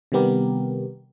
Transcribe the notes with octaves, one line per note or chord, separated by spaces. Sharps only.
C3 D#3 G3 B3 G4 A#4